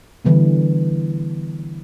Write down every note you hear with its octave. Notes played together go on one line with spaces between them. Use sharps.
D3 E3 G3 B3